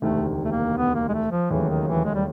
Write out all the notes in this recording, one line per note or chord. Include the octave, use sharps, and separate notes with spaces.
E1 D2 C3 D#3 A3
A3
A#3
B3
A#3
G#3
A3
F3
E1 D#2 C#3 E3 F#3 A3
D#3
E3
G#3
G3